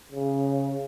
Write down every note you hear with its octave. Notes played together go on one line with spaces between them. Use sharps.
C#3